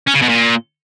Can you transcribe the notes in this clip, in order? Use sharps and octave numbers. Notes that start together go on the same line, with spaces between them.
C#4
C#3
B2
A#2